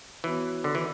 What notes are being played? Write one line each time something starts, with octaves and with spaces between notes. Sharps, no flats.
E3 B3 F#4 C#5
D3
E3